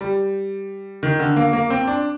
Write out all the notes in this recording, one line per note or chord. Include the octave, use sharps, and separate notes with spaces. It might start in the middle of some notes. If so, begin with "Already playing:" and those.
G3
D#3
D3
A#3
A#3
C4
D4